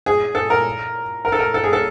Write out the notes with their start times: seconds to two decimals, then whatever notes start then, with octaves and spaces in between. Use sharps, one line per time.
0.06 G#4
0.35 A4
0.50 A#4
1.25 A#4
1.32 A4
1.39 A#4
1.54 A4
1.64 G#4
1.73 A4